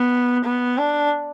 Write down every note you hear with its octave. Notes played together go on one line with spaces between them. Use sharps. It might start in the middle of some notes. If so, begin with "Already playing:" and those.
Already playing: B3
B3
D4